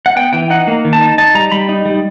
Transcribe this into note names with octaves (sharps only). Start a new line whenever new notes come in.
F#5
B3 G5
E3 G5
D#4 F#5
A#3
D#3
A5
D#4
D#4 A5
G3 A#5
G3 B5
D#4
G3